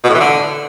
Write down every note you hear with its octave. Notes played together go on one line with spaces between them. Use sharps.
B2
A2
E3
D3